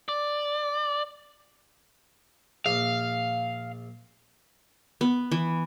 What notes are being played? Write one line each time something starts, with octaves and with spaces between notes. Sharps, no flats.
D5
A#1 F5
B3
E3